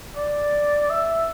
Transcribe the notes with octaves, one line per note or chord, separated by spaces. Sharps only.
D5
E5